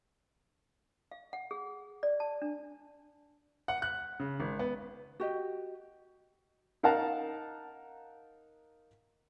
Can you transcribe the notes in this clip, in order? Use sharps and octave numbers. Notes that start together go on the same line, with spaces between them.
F5
F#5
G#4
D5
A5
D4
F#5
F#6
C#3
G#1
B3
F#4 G4 D#5
D#4 A#4 F5 F#5 A5 A#5